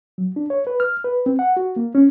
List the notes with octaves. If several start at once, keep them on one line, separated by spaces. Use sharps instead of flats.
F#3
D4
C#5
B4
F6
B4
C4
F#5
F#4
A#3
C#4